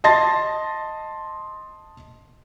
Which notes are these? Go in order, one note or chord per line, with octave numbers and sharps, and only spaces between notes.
D#5 A5 C6 A6 A#6